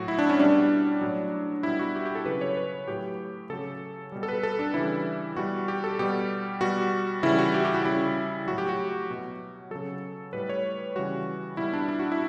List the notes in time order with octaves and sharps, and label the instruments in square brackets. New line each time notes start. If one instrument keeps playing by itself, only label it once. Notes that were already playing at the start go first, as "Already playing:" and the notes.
Already playing: [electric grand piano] A2 F#3 F#4
E4
D4
C#4
B2 G3 D4
A2 F#3
B2 G3 E4
F#4
G4
G4
A4
C#3 F#3 B4
C#5
B4
A2 F#3 G4
C#3 F#3 A4
B2 G3
A4
B4
A4
D4
C#3 E3 G3 E4
B2 G3 F#4
G4
A4
B2 G3 G4
B2 G3 F#4
C#3 E3 G3 E4
F#4
G4
G4
F#4
C#3 G3 E4
A2 F#3 F#4
G4
F#4
B2 F#3
C#3 F#3 A4
A2 G3 B4
C#5
C#3 E3 G3 F#4
B2 G3 E4
D4
E4
F#4
E4